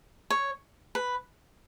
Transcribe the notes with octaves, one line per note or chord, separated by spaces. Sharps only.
C#5
B4